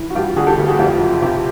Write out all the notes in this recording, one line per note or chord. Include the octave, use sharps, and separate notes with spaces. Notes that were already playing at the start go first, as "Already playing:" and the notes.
Already playing: E3
F#4
G2 F4 G4
D3 F#4 G#4
G4 A4
D2
F#4 G#4
F2 F4 G4
F#1
C3 F4 G4